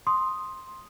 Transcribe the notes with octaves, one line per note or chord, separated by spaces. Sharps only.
C6 D#6